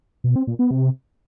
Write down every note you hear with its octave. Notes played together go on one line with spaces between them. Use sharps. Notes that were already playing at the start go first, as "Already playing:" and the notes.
B2
C4
A#2
B3
C3